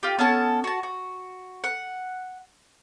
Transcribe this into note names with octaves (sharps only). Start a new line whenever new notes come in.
F4 G4
B3 C#4 A4 A5
F#4 A5
F#4
F#5